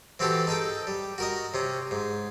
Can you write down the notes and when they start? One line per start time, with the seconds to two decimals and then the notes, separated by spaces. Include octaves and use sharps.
0.19 E3 C4 F#4 G4 A4
0.47 D#4 G#4 A4 G5
0.87 G3
1.18 F#4 A#4 D#5
1.54 C3 C#4
1.91 G#2